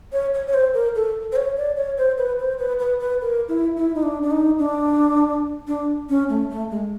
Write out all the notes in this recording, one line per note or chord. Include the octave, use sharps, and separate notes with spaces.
C#5
C#5
C#5
C5
A#4
A4
C5
C#5
D5
C#5
C5
B4
C5
B4
B4
B4
A#4
E4
E4
D#4
D4
D4
D#4
D4
D4
C#4
A3
A3
G#3